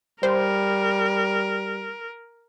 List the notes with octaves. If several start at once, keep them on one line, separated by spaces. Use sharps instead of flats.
G3 A#4 C5